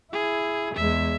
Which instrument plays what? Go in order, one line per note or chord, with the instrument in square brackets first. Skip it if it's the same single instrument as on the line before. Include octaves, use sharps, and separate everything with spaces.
[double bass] E4 [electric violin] G#4
[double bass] E2 G#3 [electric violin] E5